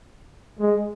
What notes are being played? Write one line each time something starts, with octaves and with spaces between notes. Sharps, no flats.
G#3